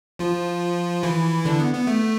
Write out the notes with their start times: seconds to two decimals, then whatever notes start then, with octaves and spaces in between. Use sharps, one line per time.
0.19 F3 F4
1.03 E3 E4
1.45 D3 D4
1.59 B3
1.73 B3
1.87 A3